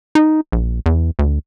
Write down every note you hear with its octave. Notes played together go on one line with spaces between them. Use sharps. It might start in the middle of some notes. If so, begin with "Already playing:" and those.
D#4
A#1
E2
D2